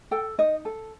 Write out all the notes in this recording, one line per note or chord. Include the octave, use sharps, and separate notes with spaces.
A4 G5
D#4 D#5
A4